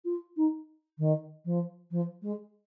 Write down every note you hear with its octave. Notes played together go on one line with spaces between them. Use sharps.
F4
D#4
D#3
F3
F3
G#3